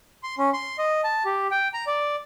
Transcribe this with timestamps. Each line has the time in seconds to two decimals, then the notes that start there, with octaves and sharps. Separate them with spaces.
0.23 C6
0.38 C#4
0.53 C6
0.78 D#5
1.04 A5
1.25 G4
1.51 G5
1.74 A#5
1.87 D5